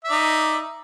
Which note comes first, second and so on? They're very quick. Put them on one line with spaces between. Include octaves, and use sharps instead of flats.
E5 D5 D#4